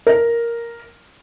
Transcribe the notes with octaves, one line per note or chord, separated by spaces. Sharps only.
A#4